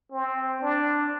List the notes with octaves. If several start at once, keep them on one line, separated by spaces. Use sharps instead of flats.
C4
D4